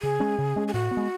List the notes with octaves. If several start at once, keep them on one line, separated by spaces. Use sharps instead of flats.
C#3 G#4
G#3 C#4
C#3
G#3 C#4
G#4
A2 F#4
B3
G#3